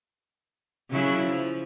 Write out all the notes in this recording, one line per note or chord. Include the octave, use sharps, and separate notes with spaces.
C#3 F#3 E4
F3